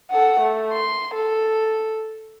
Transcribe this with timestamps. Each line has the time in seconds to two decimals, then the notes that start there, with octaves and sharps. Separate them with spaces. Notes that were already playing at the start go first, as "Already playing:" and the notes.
0.11 A4 F#5
0.40 A3
0.73 C6
1.14 A4